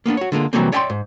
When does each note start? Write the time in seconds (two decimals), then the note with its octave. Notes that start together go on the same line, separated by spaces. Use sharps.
0.06 A#3 B3 C#4 D4
0.17 F#4 C#5
0.32 D3 G#3 A#3 F4
0.53 C3 E3 F#3 G3 A#3 C4
0.72 C#5 D5 E5 G5 A5 C6
0.90 G#2